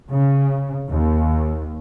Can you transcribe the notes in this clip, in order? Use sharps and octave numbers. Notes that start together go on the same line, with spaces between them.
C#3
D#2